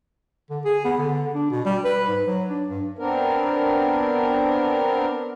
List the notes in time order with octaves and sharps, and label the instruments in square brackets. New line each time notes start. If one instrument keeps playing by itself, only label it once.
[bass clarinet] D3
G#4
B3
D3
D4
B2
G3
B4
G#2
F#3
D4
G2
[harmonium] B3 C4 D4 A#4